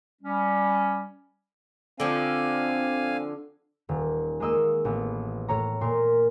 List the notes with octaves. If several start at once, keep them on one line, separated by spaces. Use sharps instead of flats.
G3 C#4
D3 F3 C4 F5 G#5
D#1
G#3 A#3 D#5 E6
A1 B3
A2 C#5 A#5
A#2 A#4 C6